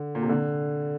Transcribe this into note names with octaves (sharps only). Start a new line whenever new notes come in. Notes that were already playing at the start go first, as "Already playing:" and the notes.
Already playing: D3
A#2
C3
D3